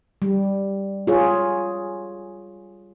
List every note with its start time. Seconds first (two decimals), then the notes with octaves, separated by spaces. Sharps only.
0.22 G3
1.07 F4 G#4 C#5